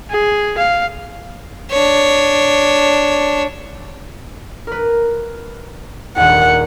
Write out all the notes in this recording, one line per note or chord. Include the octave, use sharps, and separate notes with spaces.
G#4
F5
D4 C#5
A#4 B4
D#1 G#1 D#2 F#5